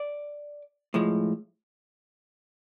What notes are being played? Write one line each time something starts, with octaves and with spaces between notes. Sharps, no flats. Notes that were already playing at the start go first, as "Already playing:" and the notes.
Already playing: D5
A2 F3 G#3